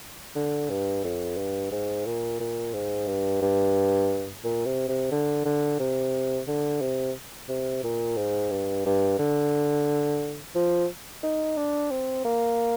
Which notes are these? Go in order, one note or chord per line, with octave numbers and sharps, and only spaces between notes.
D3
G2
F2
G2
G#2
A#2
A#2
G#2
G2
G2
A#2
C3
C3
D3
D3
C3
D3
C3
C3
A#2
G#2
G2
G2
D3
F3
D#4
D4
C4
A#3